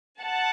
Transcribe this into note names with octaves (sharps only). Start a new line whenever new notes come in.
F#5 A5